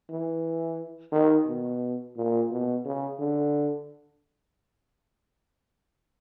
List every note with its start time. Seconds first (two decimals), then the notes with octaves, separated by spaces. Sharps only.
0.10 E3
1.12 D#3
1.47 B2
2.17 A#2
2.51 B2
2.85 C#3
3.20 D3